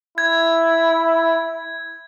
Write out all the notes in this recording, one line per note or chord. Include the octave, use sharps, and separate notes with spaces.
E4 G#6